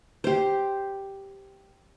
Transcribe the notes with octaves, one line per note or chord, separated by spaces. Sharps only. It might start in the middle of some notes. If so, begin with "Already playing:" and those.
G4 C5